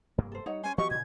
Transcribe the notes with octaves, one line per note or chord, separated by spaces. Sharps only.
F1 G2 A#3
A4 C5
G3 D#4 C#5 F#5
C#4 C5 G#5
E3 F#3 B3 F#4 G4 D#5 C#6
A#2 C#3 G#6